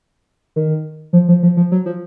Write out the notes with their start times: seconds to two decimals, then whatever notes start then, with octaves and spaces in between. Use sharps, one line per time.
0.56 D#3
1.13 F3
1.28 F3
1.43 F3
1.57 F3
1.72 F#3
1.86 F3